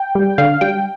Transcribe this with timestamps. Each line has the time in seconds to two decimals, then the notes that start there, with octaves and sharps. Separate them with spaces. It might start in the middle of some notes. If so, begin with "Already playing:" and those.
Already playing: G5
0.15 G3
0.38 D3 F5
0.61 G3 G5